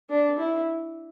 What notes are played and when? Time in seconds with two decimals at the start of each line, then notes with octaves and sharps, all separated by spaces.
0.10 D4
0.38 E4